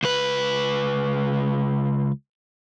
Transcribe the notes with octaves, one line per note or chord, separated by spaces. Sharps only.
C#2 B4